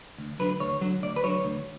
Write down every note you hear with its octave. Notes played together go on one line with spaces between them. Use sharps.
D2
D3 F#3 B4
D2 C#5
D3 F#3
D2 D5
B4
D3 F#3 C#5
D2